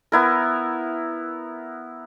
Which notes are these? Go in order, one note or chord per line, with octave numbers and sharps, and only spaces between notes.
B3 E4 A#4